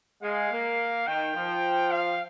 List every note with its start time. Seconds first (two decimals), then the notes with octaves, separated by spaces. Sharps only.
0.22 G#3 F5
0.51 A#3
1.07 D#3 G5
1.35 F3
1.91 F5